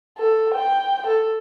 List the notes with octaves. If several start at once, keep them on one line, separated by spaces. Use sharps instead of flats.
A4
G5
A4